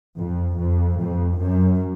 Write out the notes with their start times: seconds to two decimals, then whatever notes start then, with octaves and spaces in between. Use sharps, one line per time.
0.18 F2
0.58 F2
0.98 F2
1.38 F#2